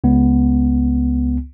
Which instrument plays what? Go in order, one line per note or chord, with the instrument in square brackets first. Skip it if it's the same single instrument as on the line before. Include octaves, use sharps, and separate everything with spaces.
[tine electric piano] C#2 B3